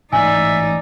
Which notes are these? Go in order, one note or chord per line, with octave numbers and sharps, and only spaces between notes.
A1 G#2 D#4 D5 E5 G#5